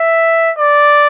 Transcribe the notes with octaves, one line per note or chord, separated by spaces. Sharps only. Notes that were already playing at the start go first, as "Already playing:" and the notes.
Already playing: E5
D5